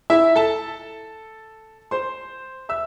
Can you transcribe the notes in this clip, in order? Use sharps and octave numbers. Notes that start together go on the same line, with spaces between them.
E4 E5
A4 A5
C5 C6
E5 E6